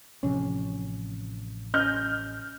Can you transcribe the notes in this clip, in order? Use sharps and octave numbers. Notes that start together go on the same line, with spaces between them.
A1 C3 F3 C#4
C#4 D#5 F6 G6